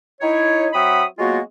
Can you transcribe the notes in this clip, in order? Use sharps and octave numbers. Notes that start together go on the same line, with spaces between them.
D#4 E4 C#5
F#3 C4 E5 F#5 B5 D#6
F#3 G#3 A#3 B3 F4 F#4